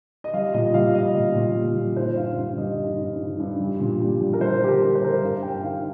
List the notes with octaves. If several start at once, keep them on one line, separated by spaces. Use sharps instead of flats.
D#5
G3 F5
A#2 D#5
G3 F5
A#2 D#5
A#2
A#2
G3
A#2
D#3 C5
G2 F5
G2 F5
G3 D#5
D#3
G2
D#3
G2
G3
A#2
G3
G3
A#4
G3 C5
G3 G4
A#4
G3
C5
G3 A#4
C5
G2 F5
G2 G5
D#3 F5